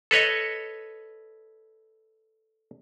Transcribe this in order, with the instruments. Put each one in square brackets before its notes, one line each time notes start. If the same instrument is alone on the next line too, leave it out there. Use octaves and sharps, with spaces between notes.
[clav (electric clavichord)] A4 B4 C#5 D#5